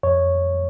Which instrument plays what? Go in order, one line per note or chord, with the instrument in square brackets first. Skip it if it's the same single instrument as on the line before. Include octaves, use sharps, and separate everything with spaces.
[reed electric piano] F2 C#5